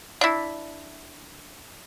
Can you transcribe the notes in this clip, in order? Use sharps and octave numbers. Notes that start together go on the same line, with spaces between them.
D4 E4